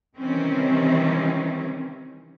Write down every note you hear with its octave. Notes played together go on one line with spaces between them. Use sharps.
C3 D#3 E3 G3 C4 C#4